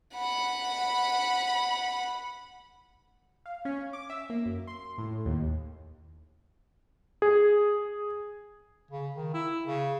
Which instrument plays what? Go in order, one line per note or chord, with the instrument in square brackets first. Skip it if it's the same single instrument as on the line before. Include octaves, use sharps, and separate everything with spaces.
[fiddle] F#5 B5
[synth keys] F5
C#4
D6
E5
A#3
F#2
C6
A2
D#2
[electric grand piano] G#4
[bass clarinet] C#3
D#3
E4
C#3